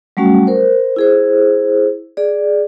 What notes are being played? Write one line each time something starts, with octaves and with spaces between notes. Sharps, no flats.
F#3 G3 A3 C#4 F#4
A#4 C5
E4 G#4 C5
G#4 D5